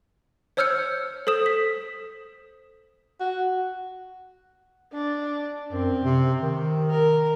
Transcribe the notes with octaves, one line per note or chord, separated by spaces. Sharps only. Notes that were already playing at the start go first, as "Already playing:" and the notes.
C5 C#5 E6 F6 G6 C#7
A4 C5 D#6 E7
B6
F#4
D4
F#2 C4
C3
D#3
A#4